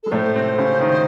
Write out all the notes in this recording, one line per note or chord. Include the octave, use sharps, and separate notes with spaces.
G#3 A4
A2 A3 C5 D5
C3 C4
C#3 C#4
D#3 D#4